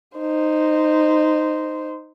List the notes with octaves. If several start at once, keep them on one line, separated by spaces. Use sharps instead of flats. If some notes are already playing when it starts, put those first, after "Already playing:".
D#4 C5